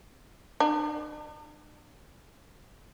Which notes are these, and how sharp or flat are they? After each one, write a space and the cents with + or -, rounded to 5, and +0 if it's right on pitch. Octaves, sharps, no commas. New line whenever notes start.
D4 +45